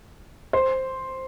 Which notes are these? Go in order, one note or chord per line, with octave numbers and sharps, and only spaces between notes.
C5